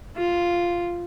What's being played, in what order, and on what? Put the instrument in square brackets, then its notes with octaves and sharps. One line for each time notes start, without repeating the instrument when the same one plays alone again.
[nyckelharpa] F4